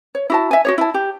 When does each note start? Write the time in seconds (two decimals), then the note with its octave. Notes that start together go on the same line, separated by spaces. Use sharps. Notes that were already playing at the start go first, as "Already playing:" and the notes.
0.15 C#5
0.30 E4 F#4 A5
0.51 E5 G#5
0.65 F#4 G4 C#5
0.78 E4 A5
0.94 G4